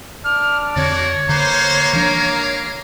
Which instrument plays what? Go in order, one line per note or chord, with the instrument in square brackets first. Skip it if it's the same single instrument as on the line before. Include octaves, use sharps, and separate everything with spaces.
[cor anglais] D4 [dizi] F6
[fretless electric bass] F2 D3 C4 [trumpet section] A#3 F#4 D5 [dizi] C#5
[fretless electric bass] D3 [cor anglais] A#3 [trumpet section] B4 C5
[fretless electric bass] E3 F3 D4 [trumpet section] G#3 A#4 F5